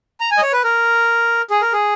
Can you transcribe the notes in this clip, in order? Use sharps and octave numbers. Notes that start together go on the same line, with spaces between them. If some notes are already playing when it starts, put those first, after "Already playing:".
A#5
G#5
D#5
C#5
B4
A#4
G#4
A#4
G#4